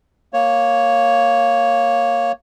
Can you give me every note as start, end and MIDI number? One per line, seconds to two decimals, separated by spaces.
0.34 2.32 58
0.34 2.32 73